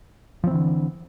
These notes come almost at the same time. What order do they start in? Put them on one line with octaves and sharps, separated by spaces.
F3 C4 E3 D3